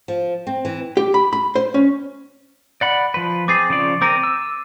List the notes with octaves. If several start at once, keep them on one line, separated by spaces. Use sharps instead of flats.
F3
C4
E3
G4
B5
B5
C5
C#4
D5 F#5 B5
F3 B4
C4 G#4 D6 A6 C7
C#3 F3 D5
C4 A#4 D6 D#7
E6